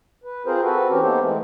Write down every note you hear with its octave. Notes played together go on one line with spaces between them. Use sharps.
B4
C4 F4 G#4 A#4 C5
C4 F#4 A4 B4
E3 C4 C#4 G4 A#4
A#3 B3 D#4 G4 A4 C5
E3 G#3 A3 C4